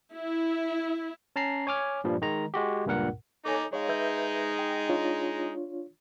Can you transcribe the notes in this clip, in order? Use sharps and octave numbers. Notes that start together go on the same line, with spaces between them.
E4
C#4 A5 A#5 C7
C#5 G#5 D6 F6
G2 A#2 F3 G3
D#3 G#3 A#5
G#3 F#4 G4
C#2 G2 A#2 A#4 F#5
D#4 A4 C#5 G#5 D6
G#3 D#4 C#5 F5
B4 E5 G6
G5
D4 F4 C#5